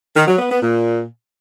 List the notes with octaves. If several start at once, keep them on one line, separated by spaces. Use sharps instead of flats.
D#3
F#3
B3
B3
A#2